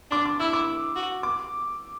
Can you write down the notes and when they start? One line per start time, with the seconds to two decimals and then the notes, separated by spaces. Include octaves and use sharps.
0.11 D4 D6
0.26 D6
0.39 E4 E6
0.53 D6
0.96 F#4
1.23 D6